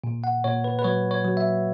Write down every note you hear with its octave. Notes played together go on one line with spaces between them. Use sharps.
A#2
F#5
A#2 C#5
B4
B4
F#3 C#5
C#5
F#3
E5